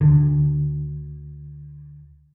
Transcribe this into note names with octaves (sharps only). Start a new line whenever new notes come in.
D2 D3